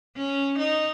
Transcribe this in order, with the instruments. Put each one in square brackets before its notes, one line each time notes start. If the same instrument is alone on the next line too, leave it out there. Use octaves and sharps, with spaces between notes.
[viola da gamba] C#4
D#4